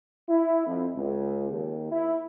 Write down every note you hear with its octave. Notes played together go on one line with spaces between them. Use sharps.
E4
F2
C#2
D#2
E4